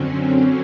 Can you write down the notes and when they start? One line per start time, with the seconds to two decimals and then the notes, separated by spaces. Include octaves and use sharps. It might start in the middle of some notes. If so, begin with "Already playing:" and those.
Already playing: F#2 D3 F#3 C4 C#4
0.19 C#4